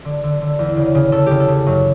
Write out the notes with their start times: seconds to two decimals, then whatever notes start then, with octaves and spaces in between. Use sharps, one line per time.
0.05 D3
0.24 D3
0.42 D3
0.59 E2
0.77 C#3
0.95 C#3
1.12 C#3 A4
1.26 C#3 G4
1.40 A4
1.48 C#3
1.66 F#2